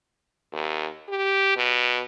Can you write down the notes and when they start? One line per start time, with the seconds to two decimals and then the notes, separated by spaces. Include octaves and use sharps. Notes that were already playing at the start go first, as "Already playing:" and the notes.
0.52 D#2
1.08 G4
1.57 B2